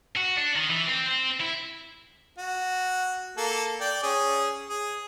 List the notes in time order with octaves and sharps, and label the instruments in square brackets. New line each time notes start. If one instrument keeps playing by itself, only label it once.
[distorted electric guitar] F#4
D4
D#3
E3
C4
C4
E4
[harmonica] F#4
A#3 A4
D5 G5
C#4 G#4
G#4